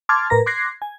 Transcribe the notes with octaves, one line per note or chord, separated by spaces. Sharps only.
A5 C6 D6 F6 G#6 A6
A2 A#4 B4 A#5 A#6
C6 D6 F#6 G#6 A#6 C7
G#5